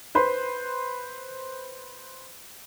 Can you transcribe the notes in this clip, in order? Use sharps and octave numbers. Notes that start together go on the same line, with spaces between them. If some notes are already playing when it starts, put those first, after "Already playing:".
B4 C5 B5